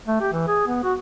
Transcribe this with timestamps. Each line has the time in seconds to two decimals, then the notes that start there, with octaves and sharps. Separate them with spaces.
0.08 A3
0.21 G4
0.33 E3
0.48 G#4
0.67 B3
0.83 F#4